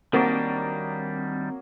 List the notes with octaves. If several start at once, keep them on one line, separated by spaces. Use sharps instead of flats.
D#3 F#3 G3 A#3 C4 D4 D#5 D6